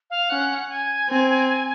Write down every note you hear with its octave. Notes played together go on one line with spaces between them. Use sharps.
F5
C#4 F#5
G#5
C4